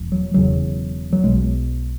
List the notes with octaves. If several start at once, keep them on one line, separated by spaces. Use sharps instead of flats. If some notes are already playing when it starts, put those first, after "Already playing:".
Already playing: E1 E2
F#3
E1 E2 C#3 F#3
F#3
B1 B2 G#3